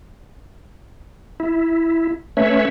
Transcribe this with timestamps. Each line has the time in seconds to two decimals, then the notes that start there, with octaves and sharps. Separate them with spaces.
1.40 E4
2.37 A3 C#4 B4 C#5 E5